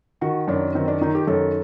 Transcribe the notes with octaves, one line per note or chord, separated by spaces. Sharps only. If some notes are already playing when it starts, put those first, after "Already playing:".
D#3 F#4
F#2 D4
D#3 C4
D4
D#3 D#4
G4
F#2 A4